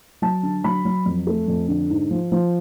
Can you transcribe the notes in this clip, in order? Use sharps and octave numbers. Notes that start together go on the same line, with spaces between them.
F#3 A5
D3
F#3 B5
F#3
F2
A3
F2
D3
G#2
F3
F3